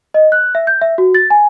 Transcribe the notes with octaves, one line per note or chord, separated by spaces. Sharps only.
D#5
F#6
E5
G6
E5
F#4
A6
G#5